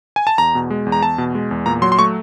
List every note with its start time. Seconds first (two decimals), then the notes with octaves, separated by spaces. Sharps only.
0.16 G#5
0.27 A5
0.38 E2 A#5
0.55 B2
0.70 G#3
0.86 E2
0.92 A#5
1.03 E2 A5
1.18 B2
1.35 G#3
1.51 E2
1.66 A#2 A#5
1.82 F#3 C6
1.92 C6
1.99 A3 C#6